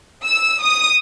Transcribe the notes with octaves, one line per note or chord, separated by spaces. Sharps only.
E6
D#6